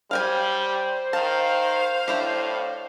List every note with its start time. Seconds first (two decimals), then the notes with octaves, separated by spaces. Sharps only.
0.11 G3 C5 F5 G5 G#5
1.13 D#3 F5 A5
2.08 A2 D4 E4 G4